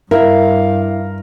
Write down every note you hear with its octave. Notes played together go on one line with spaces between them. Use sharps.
G2 E4 A#4 F5